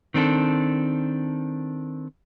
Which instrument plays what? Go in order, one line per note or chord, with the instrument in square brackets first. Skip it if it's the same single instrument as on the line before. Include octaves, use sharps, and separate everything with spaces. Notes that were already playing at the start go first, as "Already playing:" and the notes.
[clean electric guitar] D#3 C4 D4 A4